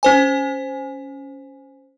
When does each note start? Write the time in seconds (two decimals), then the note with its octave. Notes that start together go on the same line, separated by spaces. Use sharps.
0.03 C#4 C5 G#5